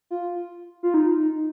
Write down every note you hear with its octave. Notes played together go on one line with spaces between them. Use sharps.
F4
F4
D#4